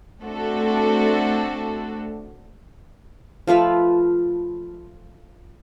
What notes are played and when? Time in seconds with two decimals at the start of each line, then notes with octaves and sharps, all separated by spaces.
0.22 A3 C4 D4 F#4 A4
3.47 F3 A3 F4 B4